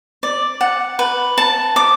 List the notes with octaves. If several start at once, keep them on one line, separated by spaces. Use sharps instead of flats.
D5
F#5
B4
A5
D6